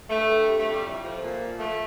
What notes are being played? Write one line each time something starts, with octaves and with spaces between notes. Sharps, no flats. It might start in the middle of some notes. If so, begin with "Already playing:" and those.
G2 A3
G2
C3
A3
F2
G3
A2
F3
A#2
F3
F3 A3